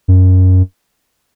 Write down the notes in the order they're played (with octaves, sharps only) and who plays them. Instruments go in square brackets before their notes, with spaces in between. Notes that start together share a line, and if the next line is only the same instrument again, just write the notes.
[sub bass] F#2